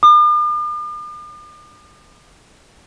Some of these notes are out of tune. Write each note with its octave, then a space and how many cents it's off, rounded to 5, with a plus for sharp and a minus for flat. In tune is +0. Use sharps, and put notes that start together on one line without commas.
D6 +45